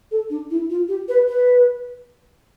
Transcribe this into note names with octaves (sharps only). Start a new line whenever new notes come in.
A4
D4
E4
F4
G4
B4
B4